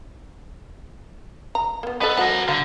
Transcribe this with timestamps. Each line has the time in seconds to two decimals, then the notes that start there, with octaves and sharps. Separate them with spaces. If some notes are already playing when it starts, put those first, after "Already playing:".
1.55 A#5
1.83 A#3 B3
2.01 B3 A4 C5 D#5
2.17 F3 F#4 A#4 F#5
2.49 D3 F5